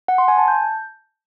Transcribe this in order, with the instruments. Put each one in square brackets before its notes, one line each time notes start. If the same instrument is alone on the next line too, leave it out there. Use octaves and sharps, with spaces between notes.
[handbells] F#5
C6
G#5
A5
G6